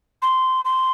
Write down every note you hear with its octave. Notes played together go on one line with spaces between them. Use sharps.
C6
C6